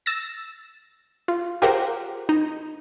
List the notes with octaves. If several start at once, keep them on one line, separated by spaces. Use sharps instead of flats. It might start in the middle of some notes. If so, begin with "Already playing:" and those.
E6 A6 A#6
F4
F4 G4 G#4 A#4 C5 F#5
D#4